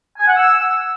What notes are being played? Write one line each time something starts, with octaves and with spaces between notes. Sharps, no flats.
G#5
F#5
E6